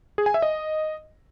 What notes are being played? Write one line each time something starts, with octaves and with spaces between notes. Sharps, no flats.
G#4
G#5
E5
D#5